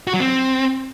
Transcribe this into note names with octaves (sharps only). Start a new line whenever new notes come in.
F#4
F#3
C4